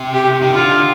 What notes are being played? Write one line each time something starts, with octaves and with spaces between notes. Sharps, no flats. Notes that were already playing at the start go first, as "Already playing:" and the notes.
Already playing: C3
G4
D#3
D3 F4